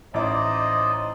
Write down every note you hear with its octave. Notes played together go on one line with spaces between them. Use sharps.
A1 D#4 E4 C5 D5 D#5 D6